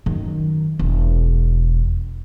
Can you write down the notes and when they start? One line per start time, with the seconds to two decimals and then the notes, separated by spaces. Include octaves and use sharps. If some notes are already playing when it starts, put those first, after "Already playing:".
0.06 F#2 D#3
0.79 E1